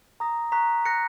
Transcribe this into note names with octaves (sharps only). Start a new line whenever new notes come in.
A#5 D#6 A#6
A#5 C#6 F#6 B6
F#6 A#6 C#7